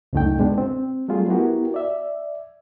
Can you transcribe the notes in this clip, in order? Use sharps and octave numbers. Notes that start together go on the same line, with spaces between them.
C#2 F#2 D3 A3 D#4 G5
B2 G#3 B3 D4
C4
F#3 G3 A3 F4 G#4
B3 E4 F#4 G4 A#4
D5 E5